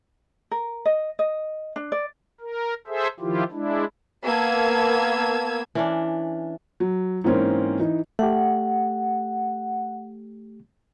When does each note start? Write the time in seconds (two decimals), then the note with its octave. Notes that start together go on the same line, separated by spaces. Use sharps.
0.51 A#4
0.85 D#5
1.19 D#5
1.76 D4
1.92 D5
2.41 A#4
2.87 G#4 A4 C5 E5
3.20 D#3 F3 E4 F4 G4
3.52 G#3 D4 E4
4.24 A#3 B3 A5 E6 G#6
5.75 E3 C#4 D4
6.80 F#3
7.24 G#2 E3 A#3 C4 C#4
7.79 E3 D#4
8.19 A3 G4 F#5